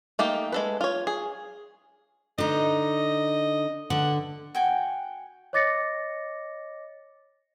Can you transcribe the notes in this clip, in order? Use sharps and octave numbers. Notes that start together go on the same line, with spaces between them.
A3 A#3 D#4 G4
G#3 A4 B4
F4 C#5
G#4
D3 D#4 D#5
D3 F#5
F#4 G5 G#5
C#5 D#5 D6 A6 A#6 C#7